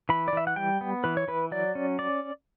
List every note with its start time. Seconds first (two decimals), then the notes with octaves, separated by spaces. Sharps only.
0.09 E3 B5
0.28 D5
0.33 E3 E5
0.47 F#5
0.56 G3 G5
0.81 B3
1.04 E3 B4
1.17 C#5
1.28 E3 B4
1.51 F#3 D5
1.75 C#4
1.99 D5